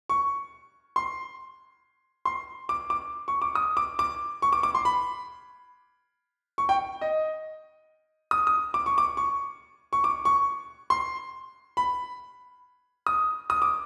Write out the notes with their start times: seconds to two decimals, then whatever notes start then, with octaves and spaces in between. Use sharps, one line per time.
0.09 C#6
0.96 C6
2.25 C6
2.69 D6
2.90 D6
3.28 C#6
3.42 D6
3.55 D#6
3.77 D6
3.99 D6
4.42 C#6
4.53 D6
4.63 D6
4.75 C6
4.85 B5
6.58 C#6
6.69 G5
7.01 D#5
8.31 D#6
8.47 D#6
8.74 D6
8.86 C#6
8.98 D6
9.17 C#6
9.93 C#6
10.04 D6
10.25 C#6
10.90 C6
11.77 B5
13.07 D#6
13.50 D#6
13.62 D6